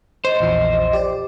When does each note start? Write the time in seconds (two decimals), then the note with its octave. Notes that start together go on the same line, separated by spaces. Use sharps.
0.25 C5 D#5
0.40 A#1 E2 F3
0.93 G4 D5